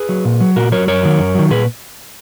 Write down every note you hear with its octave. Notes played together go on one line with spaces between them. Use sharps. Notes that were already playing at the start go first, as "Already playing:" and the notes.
Already playing: G#4 B4
F#3
A#2
F#3
A#2 F#4 A#4
F#3 A#4 C#5
F#2 A#4 C#5
D#3 F#3
F#2
D#3 F#3
A#2 G#4 B4